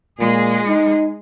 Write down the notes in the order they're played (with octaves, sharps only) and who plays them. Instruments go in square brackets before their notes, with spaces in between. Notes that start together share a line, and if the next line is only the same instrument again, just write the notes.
[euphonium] A#2 [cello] G#3 G#4
[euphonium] D#4